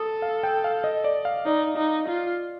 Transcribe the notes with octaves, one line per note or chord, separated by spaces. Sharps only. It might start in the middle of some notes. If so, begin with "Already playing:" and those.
Already playing: A4 D#6
F5
G5
F5
D#5
D5
F5
D#4 D5
D#4
F4